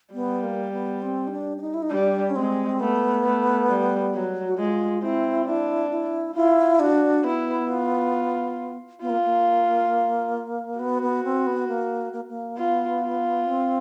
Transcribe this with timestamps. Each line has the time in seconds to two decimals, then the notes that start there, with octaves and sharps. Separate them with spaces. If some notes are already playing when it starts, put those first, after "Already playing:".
0.13 G3 B3
0.43 A#3
0.72 B3
1.02 C4
1.27 D#4
1.32 D4
1.57 D4
1.61 D#4
1.74 E4
1.82 D#4
1.90 G3 D4
2.29 C#4
2.36 G#3 C4
2.80 A3 B3
3.24 A3
3.69 G3
4.13 F#3
4.46 F#4
4.57 G#3 F4
5.02 C4 E4
5.46 D4 E4
5.91 E4
6.35 E4 F4
6.80 D4 F#4
7.24 B3 E4
7.69 F4
9.01 B3 F4
9.09 A#3
9.25 A#3
10.79 B3 F#4
11.02 B3
11.24 C4
11.46 B3
11.68 A#3
12.13 A#3
12.28 A#3
12.57 B3 F4
13.01 F4
13.46 C4